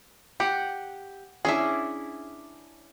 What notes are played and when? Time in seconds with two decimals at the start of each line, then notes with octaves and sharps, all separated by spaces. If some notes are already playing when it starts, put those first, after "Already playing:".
0.40 G4 F#5
1.45 C#4 D4 E4 G#4 E5